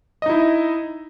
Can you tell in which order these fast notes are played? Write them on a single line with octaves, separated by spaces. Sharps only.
D#5 D#4 E4